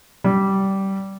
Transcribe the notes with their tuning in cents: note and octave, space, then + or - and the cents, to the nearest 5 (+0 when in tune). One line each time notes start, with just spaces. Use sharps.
G3 -15